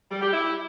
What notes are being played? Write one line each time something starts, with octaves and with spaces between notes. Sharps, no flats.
G3
G4
E4